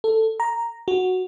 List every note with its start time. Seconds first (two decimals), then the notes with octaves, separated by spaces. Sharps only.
0.04 A4
0.40 A#5
0.88 F#4